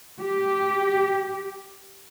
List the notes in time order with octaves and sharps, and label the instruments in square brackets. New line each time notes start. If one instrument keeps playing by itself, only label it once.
[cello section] G4